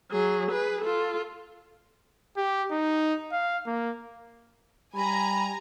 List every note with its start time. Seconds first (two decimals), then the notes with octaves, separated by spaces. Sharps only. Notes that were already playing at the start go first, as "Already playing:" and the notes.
0.11 F#3 G#4
0.51 G#4 B4
0.82 F4 A4
2.37 G4
2.71 D#4
3.32 F5
3.66 A#3
4.95 G3 G#5 A#5 B5